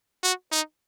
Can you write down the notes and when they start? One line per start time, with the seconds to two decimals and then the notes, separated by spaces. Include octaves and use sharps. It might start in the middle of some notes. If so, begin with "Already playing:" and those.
0.23 F#4
0.52 D#4